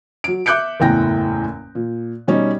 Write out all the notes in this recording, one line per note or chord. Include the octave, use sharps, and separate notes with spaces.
F#3 D7
E5 D6 F#6 G6 C#7 D7
F#1 E2 A2 G5 A#6
A#2
B2 G3 C#4 D#4